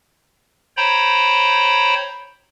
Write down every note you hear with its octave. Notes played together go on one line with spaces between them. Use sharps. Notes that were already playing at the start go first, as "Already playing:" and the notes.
C5 C#5 G5 A#5 B5